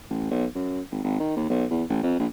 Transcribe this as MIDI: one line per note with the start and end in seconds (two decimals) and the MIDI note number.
0.10 0.29 33
0.31 0.45 35
0.55 0.80 42
0.91 0.99 32
1.04 1.17 32
1.20 1.35 51
1.36 1.44 39
1.49 1.65 35
1.71 1.83 40
1.90 2.02 33
2.03 2.15 41
2.19 2.26 34